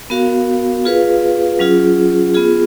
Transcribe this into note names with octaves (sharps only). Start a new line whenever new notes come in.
B3 F#4 A#4 F5
F4 G#4 B4 F5
F#3 C#4 F4 G#4
B3 F4 G#4